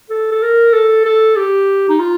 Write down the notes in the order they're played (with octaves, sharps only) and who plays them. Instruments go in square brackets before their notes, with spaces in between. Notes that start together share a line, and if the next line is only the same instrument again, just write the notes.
[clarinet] A4
A4
A#4
A4
A4
G4
D#4
F4